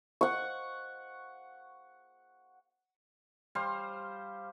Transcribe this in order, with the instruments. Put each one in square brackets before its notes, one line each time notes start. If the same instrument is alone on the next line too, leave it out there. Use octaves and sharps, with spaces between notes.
[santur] F#5 C#6
[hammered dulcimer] G3 C5 F5